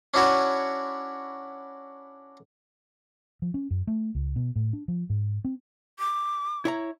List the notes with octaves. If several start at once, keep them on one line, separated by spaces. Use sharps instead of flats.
C#4 D4 E4 F#4 C#5
F3
C#4
F#2
A3
C#2
B2
A2
D4
F3
G#2
C4
D6
E4 C#5 A#5